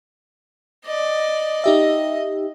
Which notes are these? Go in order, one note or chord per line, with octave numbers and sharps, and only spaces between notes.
D5 D#5
D#4 G4 D#5 E5